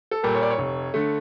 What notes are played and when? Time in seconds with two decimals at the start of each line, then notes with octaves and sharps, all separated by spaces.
0.11 A4
0.23 A#2 G3 A#3
0.35 C#5
0.42 D5
0.50 C#5
0.58 F1
0.94 D3 A3